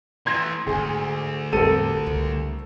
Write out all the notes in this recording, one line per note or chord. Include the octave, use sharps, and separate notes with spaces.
E3 A3 C6 G#6 A#6
D2 G#2 D3 G#4
A1 E2 G3 C4 A4 A#4 D#7
C#2